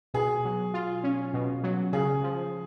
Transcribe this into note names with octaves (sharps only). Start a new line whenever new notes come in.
B2 G#4
F#3
F4
C#4
B2
F#3
C#3 G#4
F3